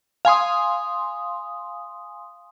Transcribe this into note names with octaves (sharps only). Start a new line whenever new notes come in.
F5 G#5 C6 D#6